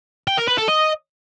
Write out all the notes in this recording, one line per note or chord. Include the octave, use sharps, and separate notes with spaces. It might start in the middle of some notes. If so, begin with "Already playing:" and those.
G5
A#4
B4
A4
D#5